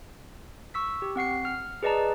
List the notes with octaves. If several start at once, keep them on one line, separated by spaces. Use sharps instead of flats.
C#6 E6 B6
G4
C4 F#5 C7 C#7
F6
G#4 B4 D5 D#5 A5 A#5